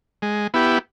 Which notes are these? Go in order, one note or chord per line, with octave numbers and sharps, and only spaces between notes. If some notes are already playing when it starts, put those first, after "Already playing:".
G#3
B3 E4 G4